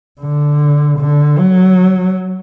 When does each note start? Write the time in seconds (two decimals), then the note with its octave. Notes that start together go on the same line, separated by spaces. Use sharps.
0.20 D3
1.00 D3
1.38 F#3